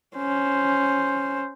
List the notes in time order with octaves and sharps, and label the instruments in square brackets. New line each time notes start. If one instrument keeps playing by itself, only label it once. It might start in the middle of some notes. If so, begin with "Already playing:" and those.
[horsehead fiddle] C#4 C5